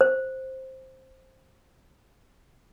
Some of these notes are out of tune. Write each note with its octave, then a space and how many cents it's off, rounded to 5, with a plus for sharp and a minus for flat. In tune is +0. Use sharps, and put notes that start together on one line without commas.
C5 +5